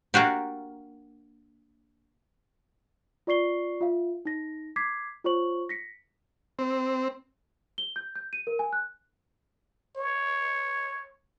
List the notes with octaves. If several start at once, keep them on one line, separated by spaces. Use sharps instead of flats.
A#3 D4 F#4 G4
F4 D5 C#6 C7 G7
F4 E5 F5
D#4 A#6
D6 G#6 B6 C7
F4 C5 C#5 C#6 F#7
A#6 B6 C#7
C4
G7
G6
G6
D#7
A#4
G#5
F#6
C#5